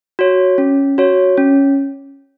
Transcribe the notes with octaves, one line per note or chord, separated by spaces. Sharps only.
F#4 C#5
C#4
F#4 C#5
C#4